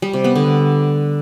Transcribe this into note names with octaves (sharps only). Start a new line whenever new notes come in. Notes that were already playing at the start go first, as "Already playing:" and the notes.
G3
C3
B3
D3